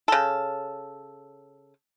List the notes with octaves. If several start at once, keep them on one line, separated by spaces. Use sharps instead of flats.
C#3 A4